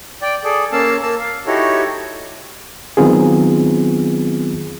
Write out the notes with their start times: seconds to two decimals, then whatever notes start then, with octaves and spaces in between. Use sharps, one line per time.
0.22 D5 G5
0.44 G#4 A4 D5
0.72 A#3 C#4 F5 A5 E6
1.02 A#3 A5 E6
1.20 F5
1.47 D#4 E4 F#4 G4 A4 C#5
2.97 D#3 F#3 B3 C4 F4 G#4